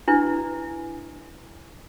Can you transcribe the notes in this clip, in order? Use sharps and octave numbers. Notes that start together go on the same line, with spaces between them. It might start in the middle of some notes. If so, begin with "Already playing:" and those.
D4 E4 B4